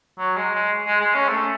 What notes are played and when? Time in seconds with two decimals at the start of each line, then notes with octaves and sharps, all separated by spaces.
0.18 F#3
0.36 G#3
0.55 G#3
0.87 G#3
1.01 G#3
1.14 C#4
1.29 A3